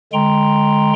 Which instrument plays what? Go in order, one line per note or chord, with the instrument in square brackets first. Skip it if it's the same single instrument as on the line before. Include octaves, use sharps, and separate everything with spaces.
[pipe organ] D3 G#3 G5 A#5 C6